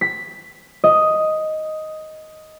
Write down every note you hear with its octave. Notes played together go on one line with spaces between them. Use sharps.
B6
D#5